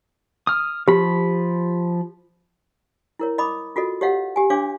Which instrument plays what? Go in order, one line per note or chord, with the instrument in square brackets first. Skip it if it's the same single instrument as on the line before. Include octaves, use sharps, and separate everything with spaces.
[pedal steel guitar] D#6 F6
[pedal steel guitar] F3 B5 [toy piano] G4
[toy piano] E4 A#4 C#5
D#5 B5 D6 D#6
F4 F#4 A4 D#5
G4 C#5 D#5 F5 F#5
G4 G#5
D4 C#5 F5 G#5 D6